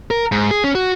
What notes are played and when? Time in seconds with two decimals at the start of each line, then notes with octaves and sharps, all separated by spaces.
0.11 A#4
0.32 G#2
0.51 G#4
0.64 C#4
0.75 F#4